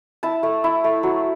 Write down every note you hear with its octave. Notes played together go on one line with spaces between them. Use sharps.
E4 A5
A3
E4
A3
F#3